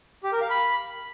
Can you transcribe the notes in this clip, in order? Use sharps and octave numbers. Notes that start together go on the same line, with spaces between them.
G4
A#4
F5
B5